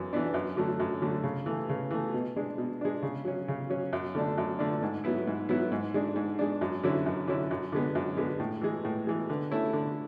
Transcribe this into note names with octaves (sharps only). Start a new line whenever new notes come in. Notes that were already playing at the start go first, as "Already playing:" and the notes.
Already playing: F#2 E3
E3 B3 D4
F#2
D3 F#3 A3
F#2
D3 F#3 A3
C#3
E3 A3
C#3
E3 A3
B2
G#3 D4
B2
G#3 D4
C#3
F#3 C#4
C#3
F#3 C#4
F#2
D3 A3 D4
F#2
D3 A3 D4
G#2
F#3 B3 E4
G#2
F#3 B3 E4
G#2
G#3 D4
G#2
G#3 D4
F#2
D3 F#3 C#4 E4
F#2
D3 F#3 C#4 E4
F#2
D3 G#3 B3
F#2
D3 G#3 B3
A2
E3 G#3
A2
E3 G#3
D3
A3 C#4 E4
D3